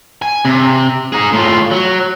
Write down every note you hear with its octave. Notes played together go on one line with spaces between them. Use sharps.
G#5
C3
D#4 G#4
A2 F4
F#3